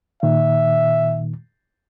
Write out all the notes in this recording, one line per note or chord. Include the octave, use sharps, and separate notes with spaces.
A#2 D#3 E5